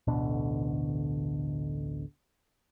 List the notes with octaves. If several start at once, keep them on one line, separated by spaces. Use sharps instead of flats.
A1 D2 B2 D3